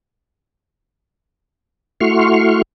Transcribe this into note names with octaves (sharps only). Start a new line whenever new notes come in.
A3 E4 F#4 C6 C#6 F6